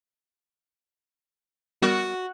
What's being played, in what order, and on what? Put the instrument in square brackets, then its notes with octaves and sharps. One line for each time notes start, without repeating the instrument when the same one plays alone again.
[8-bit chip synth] G3 B3 A#4 [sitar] F#4